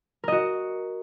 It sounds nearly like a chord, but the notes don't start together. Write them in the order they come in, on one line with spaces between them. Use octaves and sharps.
A#4 D#5 F#4